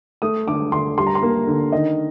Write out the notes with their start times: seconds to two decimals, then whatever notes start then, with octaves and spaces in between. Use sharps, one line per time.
0.22 A3 D#6
0.47 D3 D6
0.72 D3 C6
0.98 G3 C6
1.07 A#5
1.15 C6
1.23 A#3
1.47 D3
1.72 D#3 D#5